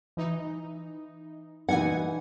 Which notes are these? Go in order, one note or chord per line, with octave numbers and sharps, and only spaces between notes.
E3 D#4
A#2 E3 D#4 F#5 G#5 G#6